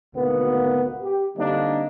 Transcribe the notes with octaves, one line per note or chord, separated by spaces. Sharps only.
G#1 D2 B2 A#3 B3
G4
D3 G3 A#3 C4 D4 D#4